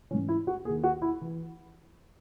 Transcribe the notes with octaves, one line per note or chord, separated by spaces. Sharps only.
G#2 E3 C#4
E4
F#4
D#2 D#3 G#4
F#4
E4
E3